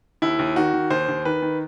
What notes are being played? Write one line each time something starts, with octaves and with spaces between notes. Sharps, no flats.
D#2 E4
D#2
D#3 F#4
D#3
D#2 C5
D#2
D#3 B4
D#3